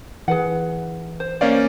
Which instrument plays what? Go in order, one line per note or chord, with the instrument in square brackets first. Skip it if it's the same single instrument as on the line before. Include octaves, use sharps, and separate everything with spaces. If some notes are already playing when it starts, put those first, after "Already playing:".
[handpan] E3 [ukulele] G#4 B4 F#5
[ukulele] C5
[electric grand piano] A#3 C#4 D5 [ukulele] C5 F5